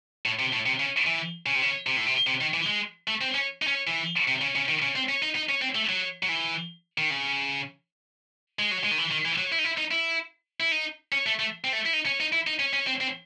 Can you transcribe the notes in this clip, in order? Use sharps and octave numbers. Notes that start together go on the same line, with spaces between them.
A2
C3
A2
C3
C#3
E3
C#3
C3
C#3
C3
A2
C3
C3
D#3
E3
G#3
A3
C4
C#4
D#4
C#4
E3
C3
C#3
C#3
D#3
C#3
C4
C#4
D#4
D#4
C#4
C4
A3
F#3
F#3
E3
D#3
C#3
G#3
F#3
G#3
D#3
E3
D#3
E3
F#3
E4
D#4
E4
D#4
E4
E4
D#4
C#4
A3
A3
C4
A3
E4
D#4
C#4
D#4
E4
D#4
C#4
C#4
C4
C4